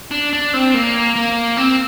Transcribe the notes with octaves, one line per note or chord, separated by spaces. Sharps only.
D4
D4
C4
A#3
A#3
C4